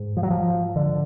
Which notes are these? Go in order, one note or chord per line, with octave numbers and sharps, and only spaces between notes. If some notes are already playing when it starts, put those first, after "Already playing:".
Already playing: G#2
F3
F#3
F3
D3